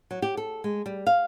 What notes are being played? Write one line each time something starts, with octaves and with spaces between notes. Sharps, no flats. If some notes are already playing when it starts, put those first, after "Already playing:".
F#3
G4
A4
G#3
G3
F5